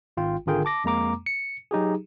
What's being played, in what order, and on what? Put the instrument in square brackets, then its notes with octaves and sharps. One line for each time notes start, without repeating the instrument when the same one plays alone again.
[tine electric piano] G#1 F4 G5
G#1 D3 F4 G#4 A#4 G5
A5 D6 A#6
F2 G#3 A#3 A#5 D6
C#7
F#3 D#4 G4 G#4